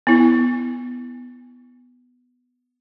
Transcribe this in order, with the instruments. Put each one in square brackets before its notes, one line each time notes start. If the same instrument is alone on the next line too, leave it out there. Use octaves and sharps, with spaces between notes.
[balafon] B3 E4